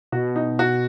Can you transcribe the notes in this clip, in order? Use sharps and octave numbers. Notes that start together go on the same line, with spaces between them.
B2 F#4
D#4
F#4